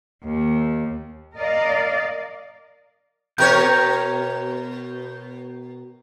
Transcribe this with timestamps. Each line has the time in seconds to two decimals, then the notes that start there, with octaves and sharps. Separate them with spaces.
0.23 D#2
1.36 A#4 D5 D#5 F5
3.38 B2 A#4 C#5 G6